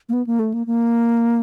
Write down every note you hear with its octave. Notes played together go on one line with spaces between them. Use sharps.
A#3
B3
A#3
A3
A#3
A#3